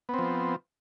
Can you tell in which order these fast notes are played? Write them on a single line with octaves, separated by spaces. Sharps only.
B3 C4 F3